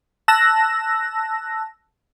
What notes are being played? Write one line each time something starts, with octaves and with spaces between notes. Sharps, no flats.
A5 E6 F#6 A#6